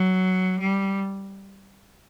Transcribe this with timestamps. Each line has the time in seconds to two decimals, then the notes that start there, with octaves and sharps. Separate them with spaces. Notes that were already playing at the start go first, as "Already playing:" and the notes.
Already playing: F#3
0.60 G3